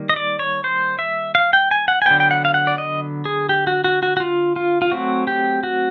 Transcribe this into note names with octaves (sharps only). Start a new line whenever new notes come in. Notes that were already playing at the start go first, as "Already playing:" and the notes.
Already playing: D#3 G3 A#3
D#5
D5
C#5
C5
E5
F5
G5
G#5
F#5
G#5
D3 F#3 B3 G5
G5
F#5
F5
F#5
D5
D#5
G#4
G4
F#4
F#4
F#4
F#4
F4
F4
F4
F#3 A3 C4 F#4
G4
F#4